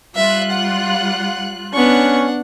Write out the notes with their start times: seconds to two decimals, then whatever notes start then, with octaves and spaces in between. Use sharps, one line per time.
0.16 G3 F4 E5 F#6
0.52 F#5
1.74 B3 C#4 D4 F#5 C#6